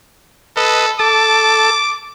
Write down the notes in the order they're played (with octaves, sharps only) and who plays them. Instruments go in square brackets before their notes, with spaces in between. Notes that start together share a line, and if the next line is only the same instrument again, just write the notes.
[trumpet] A4 [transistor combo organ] B4 D#5
[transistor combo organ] A4 A5 [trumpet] D6